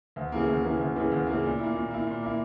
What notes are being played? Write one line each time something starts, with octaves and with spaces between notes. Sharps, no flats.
D2
C#3 E3 A#3
D2
C#3 E3 A#3
D2
C#3 E3 A#3
D2
C#3 E3 A#3
A#2
A#3 E4
A#2
A#3 E4
A#2
A#3 E4